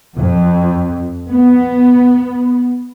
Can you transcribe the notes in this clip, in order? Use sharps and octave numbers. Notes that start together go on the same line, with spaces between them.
F2
B3